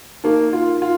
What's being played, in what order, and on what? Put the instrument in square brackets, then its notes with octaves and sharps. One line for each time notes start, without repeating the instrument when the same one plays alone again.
[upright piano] A#3 [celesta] D#4 G4 A#4
[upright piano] F4
F4